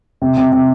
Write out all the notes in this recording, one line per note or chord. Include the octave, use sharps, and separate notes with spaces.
C3
C3
C3